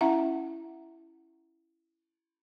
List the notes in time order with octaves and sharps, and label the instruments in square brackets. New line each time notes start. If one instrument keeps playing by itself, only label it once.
[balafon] C#4 E4 E5 F#5 A#5